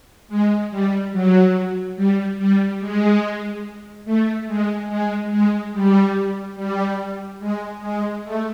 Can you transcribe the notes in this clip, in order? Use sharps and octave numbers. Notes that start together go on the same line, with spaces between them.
G#3
G3
F#3
G3
G3
G#3
A3
G#3
G#3
G#3
G3
G3
G#3
G#3
A3